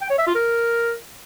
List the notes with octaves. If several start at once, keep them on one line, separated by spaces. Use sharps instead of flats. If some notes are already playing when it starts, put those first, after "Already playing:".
G5
C#5
E5
F4
A#4